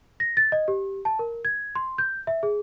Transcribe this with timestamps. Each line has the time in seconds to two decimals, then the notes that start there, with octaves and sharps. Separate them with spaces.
0.20 A#6
0.37 A6
0.52 D#5
0.68 G4
1.05 A5
1.19 A#4
1.45 G#6
1.75 C6
1.98 G6
2.27 E5
2.43 G#4